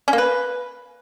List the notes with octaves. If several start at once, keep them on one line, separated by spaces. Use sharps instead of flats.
C#4
A#3
B4